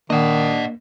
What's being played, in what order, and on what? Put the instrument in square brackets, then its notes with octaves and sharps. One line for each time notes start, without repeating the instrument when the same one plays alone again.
[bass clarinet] D#3 [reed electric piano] A#3 [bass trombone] D4 [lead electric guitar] D#5 F#5